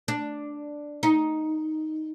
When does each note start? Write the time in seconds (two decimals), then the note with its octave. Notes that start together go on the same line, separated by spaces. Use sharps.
0.08 D4
1.03 D#4